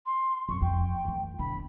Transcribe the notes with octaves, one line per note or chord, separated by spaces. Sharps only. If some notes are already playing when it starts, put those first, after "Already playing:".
C6
F2 C#6
F2 G5
E3 A3
E2 D3 B5